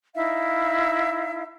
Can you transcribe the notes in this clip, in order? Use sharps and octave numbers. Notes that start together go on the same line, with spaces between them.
D#4 E4 E5 F5